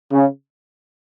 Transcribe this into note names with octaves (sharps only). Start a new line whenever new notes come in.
C#3